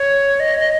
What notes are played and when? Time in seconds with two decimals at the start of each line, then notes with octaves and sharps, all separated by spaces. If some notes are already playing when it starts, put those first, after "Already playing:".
Already playing: C#5
0.40 D#5
0.60 D#5